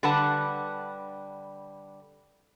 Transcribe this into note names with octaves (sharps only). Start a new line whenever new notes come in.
D3 G3 B4 F#5 A5